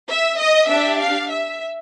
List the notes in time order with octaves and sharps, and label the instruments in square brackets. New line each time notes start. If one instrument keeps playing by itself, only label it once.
[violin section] E5
D#5
D4 G4 E5
F5
E5